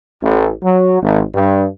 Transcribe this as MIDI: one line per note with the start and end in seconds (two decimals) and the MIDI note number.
0.22 0.49 33
0.63 0.99 54
1.01 1.22 32
1.34 1.65 43